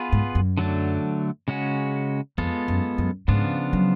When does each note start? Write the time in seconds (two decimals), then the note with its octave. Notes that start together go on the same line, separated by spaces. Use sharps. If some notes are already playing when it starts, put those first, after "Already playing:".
Already playing: B3 F4 G#4 B4
0.12 G#2
0.35 F#2
0.57 D3 F#3 A3 D4
1.48 C#3 G#3 C#4 F#4
2.38 F2 G#3 B3 F4 A4
2.68 F#2
2.98 F#2
3.28 G#2 C#3 F3 B3 D4 F4
3.73 F#3